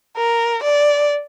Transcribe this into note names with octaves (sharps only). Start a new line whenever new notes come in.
A#4
D5